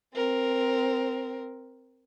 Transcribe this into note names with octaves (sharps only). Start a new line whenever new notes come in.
C4 A#4